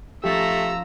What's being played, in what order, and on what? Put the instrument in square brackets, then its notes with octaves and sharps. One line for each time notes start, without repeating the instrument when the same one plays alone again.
[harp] F3 C#4 [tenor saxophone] A3 [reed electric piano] G4 A6 [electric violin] A#5 E6